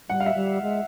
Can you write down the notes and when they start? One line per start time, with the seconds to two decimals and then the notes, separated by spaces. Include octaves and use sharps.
0.09 G3 F#5
0.20 F5
0.26 E5
0.35 G3
0.62 G#3